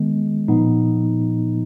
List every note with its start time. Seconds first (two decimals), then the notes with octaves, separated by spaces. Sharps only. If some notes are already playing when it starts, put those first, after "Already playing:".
Already playing: D#3 G#3 B3
0.48 A#2 F3 B3 D#4